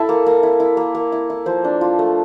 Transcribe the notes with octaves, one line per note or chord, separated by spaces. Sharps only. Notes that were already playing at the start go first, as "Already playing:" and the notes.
Already playing: E4 A4
A#3
A#3
E4
E4
A#3
A#3
E4
E4
F3 C5
D4
F4
A3